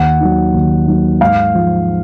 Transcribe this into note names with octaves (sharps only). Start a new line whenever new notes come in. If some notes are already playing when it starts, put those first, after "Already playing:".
Already playing: D#2 F#5
D#3 F#3
D#2
D#3 F#3
G#2 F5
F3